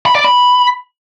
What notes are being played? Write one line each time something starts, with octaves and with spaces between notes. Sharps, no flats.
B5
D5
B5